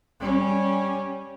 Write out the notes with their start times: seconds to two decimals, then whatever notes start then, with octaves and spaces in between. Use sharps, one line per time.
0.21 G3 C#4